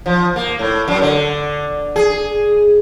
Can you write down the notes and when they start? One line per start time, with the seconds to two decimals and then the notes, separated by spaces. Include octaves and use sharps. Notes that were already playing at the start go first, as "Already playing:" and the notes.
0.06 F3
0.36 A#3
0.59 A2
0.88 F#2
1.02 D3
1.96 G#4